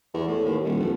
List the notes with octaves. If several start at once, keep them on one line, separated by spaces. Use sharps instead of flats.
E2
A2
D#2
D#1
F1